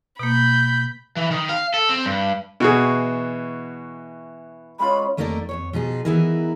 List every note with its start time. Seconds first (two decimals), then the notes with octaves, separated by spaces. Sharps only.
0.19 B2 A#3 B5 G6
1.16 E3
1.31 D#3
1.49 F5
1.74 A4
1.89 C4
2.05 G2
2.60 B2 E3 F#4 G#4
4.79 G#3 C#4 F4 B5
5.17 F2 A3 A#3 D#4 A#4 D5
5.49 F2 G#2 C#5
5.73 B2 F3 D#4 G#4
6.05 E3 B3 D#4 E4 G#4 A#4